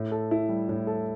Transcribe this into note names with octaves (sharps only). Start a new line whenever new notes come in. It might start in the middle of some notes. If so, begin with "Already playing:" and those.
Already playing: A2
A4
E4
G3
A2
A4